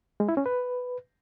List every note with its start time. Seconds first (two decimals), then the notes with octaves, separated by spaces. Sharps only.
0.20 G#3
0.29 E4
0.37 C#4
0.46 B4